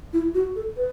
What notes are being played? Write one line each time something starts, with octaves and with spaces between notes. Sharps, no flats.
E4
F#4
A4
B4